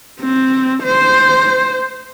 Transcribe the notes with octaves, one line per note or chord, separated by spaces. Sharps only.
C4
C5